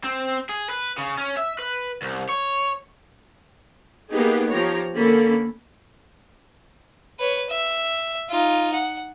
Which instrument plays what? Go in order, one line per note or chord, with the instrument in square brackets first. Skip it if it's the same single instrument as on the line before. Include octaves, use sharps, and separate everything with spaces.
[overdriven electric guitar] C4
G#4
B4
C#3
C#4
E5
B4
C2
C#5
[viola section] A#3 B3 D#4 G4 G#4 B4
F3 G4 C#5 A#5
D3 A#3 C#4 A4 B5
[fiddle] B4 C#5
E5
D#4 F4
F#5